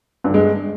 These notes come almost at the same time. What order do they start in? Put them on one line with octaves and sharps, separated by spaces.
G2 D3 G#3